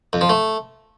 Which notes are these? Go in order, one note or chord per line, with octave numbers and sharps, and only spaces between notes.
F2
F3
A3